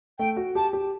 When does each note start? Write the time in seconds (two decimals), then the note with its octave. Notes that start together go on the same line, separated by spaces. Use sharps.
0.19 A3 G5
0.37 F#4
0.55 G4 A5
0.73 G4